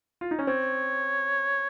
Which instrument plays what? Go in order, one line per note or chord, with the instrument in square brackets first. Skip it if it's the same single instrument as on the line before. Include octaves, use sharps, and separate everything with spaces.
[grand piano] F4
D#4
C#4
[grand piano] C4 [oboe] C#5